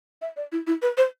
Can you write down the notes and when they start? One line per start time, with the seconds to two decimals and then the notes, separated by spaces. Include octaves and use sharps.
0.22 E5
0.36 D5
0.52 E4
0.67 E4
0.82 B4
0.97 C5